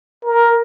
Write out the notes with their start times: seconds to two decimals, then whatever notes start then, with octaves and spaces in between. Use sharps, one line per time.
0.25 A#4